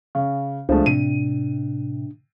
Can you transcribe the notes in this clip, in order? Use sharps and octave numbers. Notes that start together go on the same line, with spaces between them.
C#3
C#2 F3 G#3 A3 D4
A2 C3 D#7